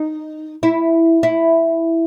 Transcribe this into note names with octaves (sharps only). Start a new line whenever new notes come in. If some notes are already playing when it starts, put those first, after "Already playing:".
Already playing: D#4
E4
E4